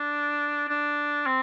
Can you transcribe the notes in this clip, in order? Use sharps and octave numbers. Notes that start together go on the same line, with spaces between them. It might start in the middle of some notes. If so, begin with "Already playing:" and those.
Already playing: D4
D4
C4